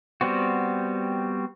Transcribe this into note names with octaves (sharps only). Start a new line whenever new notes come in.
G3 B3 C4 F#4